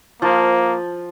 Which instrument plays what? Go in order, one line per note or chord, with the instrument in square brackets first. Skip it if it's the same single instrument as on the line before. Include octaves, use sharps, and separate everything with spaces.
[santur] F3 [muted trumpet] A#3